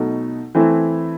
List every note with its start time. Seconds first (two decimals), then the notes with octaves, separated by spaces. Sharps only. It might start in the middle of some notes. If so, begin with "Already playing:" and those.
Already playing: B2 F#3 A3 D#4 A4
0.55 E3 A3 C4 E4